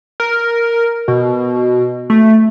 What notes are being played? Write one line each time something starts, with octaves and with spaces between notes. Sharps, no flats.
A#4
B2
A3